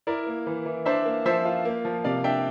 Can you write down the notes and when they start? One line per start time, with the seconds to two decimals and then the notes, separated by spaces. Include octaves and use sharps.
0.07 E4 A#4 D5
0.27 A#3
0.46 E3
0.66 E3
0.86 D4 C5 E5
1.05 A#3
1.25 F3 C5 E5
1.45 F4
1.65 A#3
1.85 F3
2.04 C3 D5 F5
2.24 D4 E5 G5